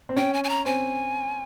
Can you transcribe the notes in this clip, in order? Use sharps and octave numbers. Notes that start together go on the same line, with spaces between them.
C4
C#4 G5
G#5
G#5
A#5
C4 G#5